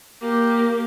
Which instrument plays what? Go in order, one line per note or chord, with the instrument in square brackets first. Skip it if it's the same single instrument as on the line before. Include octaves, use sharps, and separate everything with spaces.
[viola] A#3 G4